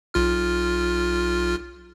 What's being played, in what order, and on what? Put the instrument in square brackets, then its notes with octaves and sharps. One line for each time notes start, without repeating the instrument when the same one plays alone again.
[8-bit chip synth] B1 F4 F6